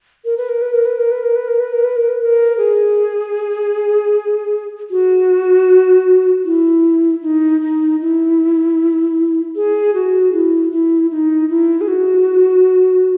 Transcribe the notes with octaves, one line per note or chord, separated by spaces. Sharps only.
A#4
B4
A#4
B4
A#4
B4
A#4
B4
A#4
B4
A#4
B4
A#4
B4
A#4
B4
A#4
G#4
F#4
E4
D#4
D#4
E4
G#4
F#4
E4
E4
D#4
E4
G#4
F#4